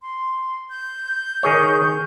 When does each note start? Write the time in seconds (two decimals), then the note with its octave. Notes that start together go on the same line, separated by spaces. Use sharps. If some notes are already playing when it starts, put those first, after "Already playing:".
0.02 C6
0.70 G6
1.43 D#3 G#4 C#5